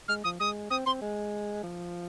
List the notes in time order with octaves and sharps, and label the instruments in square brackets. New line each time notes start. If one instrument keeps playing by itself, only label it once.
[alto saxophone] G#3 [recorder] F6
[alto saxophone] F3 [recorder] D#6
[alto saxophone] G#3 [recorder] D#6
[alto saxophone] C4 [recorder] D#6
[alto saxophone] C4 [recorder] C6
[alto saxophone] G#3
F3